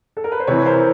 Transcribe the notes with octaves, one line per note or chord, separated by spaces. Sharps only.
A4
A#4
B4
C5
C3 E3 B4 C#5
A#4 C5